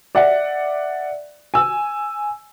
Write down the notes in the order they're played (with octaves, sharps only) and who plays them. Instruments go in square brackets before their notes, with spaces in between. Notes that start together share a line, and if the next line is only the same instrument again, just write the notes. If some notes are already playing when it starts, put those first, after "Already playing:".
[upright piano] D5 E5 F#5
G#5 E6